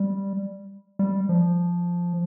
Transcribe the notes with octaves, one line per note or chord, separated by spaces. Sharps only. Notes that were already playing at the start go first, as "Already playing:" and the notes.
Already playing: G3
G3
F3